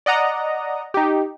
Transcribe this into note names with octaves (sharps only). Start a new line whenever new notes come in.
D5 D#5 F#5 A#5 D#6
D#4 G4